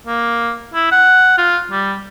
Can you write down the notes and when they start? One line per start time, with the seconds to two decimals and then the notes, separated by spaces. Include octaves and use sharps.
0.07 A#3
0.74 E4
0.92 F#5
1.38 F4
1.72 G3